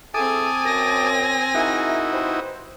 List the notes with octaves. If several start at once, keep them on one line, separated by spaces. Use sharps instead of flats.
C4 E4 G#4 A4 G#5 A5 D6 D#6
F#2 A#6
D#4 E4 F#4 G#4 A#4 E5
G4 B4 C5